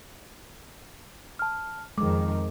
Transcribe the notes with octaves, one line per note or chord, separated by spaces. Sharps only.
A5 F6
F2 D#3 G#3 D6